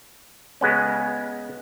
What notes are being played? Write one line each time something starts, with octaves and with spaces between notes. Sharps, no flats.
C#3 G#3 B3 C#4